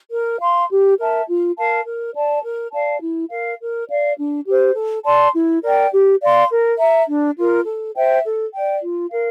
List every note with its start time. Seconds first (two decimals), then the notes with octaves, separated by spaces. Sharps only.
0.12 A#4
0.40 F5 C6
0.71 G4
0.98 A#4 E5 A5
1.28 F4
1.58 A#4 F5 A5
1.87 A#4
2.15 D5 A5
2.44 A#4
2.73 D5 F5 A5
3.02 E4
3.31 A#4 F5
3.61 A#4
3.89 D5 F5
4.18 D4
4.47 G4 C5
4.76 A4
5.05 D5 A5 C6
5.35 E4
5.64 A#4 D5 G5
5.93 G4
6.21 D5 F5 C6
6.51 A#4
6.79 E5 A#5
7.08 D4
7.37 F4 A#4
7.66 A4
7.96 C5 E5 G5
8.25 A4
8.54 D5 G5
8.83 F4
9.11 A#4 F5